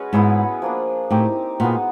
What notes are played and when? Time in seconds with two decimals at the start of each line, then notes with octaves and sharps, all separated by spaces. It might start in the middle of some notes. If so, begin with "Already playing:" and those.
Already playing: G#3 C#4 F#4 B4
0.13 G#2 B3 E4 G#4 C#5
0.62 F3 A#3 D4
1.11 A2 C4 D#4 G4
1.60 A#2 G#3 B3 D#4 F#4